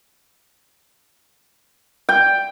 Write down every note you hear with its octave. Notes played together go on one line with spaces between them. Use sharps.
G5